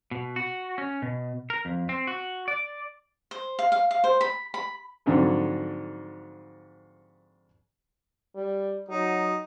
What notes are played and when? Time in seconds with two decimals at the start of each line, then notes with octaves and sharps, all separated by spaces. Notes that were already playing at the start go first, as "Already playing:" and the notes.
0.11 B2
0.36 F#4
0.78 C#4
1.02 B2
1.50 A#4
1.65 F2
1.89 C4
2.07 F#4
2.48 D5
3.31 C5
3.59 F5
3.72 F5
3.91 F5
4.04 C5
4.21 B5
4.54 B5
5.06 F2 G#2 D3 F#3
8.35 G3
8.89 F#3 D#4